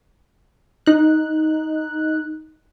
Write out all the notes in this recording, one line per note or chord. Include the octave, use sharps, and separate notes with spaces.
D#4 F#6